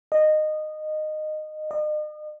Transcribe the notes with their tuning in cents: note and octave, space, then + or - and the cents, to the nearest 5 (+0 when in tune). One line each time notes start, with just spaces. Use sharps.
D#5 -15
D#5 -40